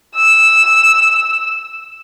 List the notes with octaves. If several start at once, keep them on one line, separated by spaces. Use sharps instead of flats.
E6